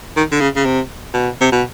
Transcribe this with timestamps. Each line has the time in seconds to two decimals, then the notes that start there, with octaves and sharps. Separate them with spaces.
0.16 D#3
0.31 D3
0.41 C#3
0.56 C#3
0.65 C3
1.14 B2
1.41 C3
1.52 B2